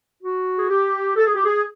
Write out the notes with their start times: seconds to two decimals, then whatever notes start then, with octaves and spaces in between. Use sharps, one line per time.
0.23 F#4
0.59 G#4
0.69 G4
1.16 A4
1.26 G#4
1.35 G4
1.45 G#4